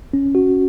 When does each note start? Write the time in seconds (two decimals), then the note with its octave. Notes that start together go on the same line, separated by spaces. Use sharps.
0.13 C#4
0.35 F#4